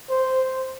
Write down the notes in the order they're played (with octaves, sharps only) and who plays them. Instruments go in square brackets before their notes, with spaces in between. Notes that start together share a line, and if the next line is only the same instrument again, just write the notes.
[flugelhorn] C5